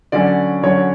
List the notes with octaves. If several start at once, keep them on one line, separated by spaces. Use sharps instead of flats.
D3 F#3 C#4 D5
D3 F#3 C#4 C#5